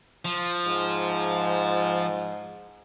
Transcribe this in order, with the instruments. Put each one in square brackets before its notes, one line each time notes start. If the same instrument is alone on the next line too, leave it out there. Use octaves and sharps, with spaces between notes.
[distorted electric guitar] F3
[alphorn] G#2